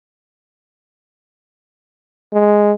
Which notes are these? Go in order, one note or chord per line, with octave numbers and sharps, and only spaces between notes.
G#3